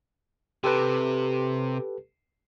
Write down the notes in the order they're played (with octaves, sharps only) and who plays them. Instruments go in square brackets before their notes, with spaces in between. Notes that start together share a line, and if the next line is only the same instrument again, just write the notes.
[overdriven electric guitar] C3 [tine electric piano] G4 A4 B4